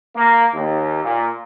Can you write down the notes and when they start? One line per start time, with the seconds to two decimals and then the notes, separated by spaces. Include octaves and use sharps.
0.16 A#3
0.54 D#2
1.05 A#2